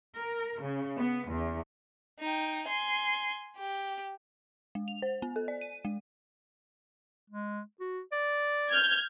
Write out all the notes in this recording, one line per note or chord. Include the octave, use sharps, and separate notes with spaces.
A#4
C#3
B3
E2
D#4 G5
G#5 C6
G4
G#3
F7
C5
B3
A4
D5
D#7
G#3
G#3
F#4
D5
F6 G6 G#6